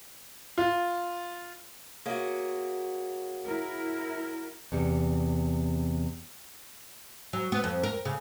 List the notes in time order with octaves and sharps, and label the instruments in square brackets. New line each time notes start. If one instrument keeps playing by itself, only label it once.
[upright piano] F4
[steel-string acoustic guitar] A#3 F#4 [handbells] G#4 C#5 E5
[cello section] E4 A#4
[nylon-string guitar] E2 C3 G3
[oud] F#3
B3
F2
A#4
C#3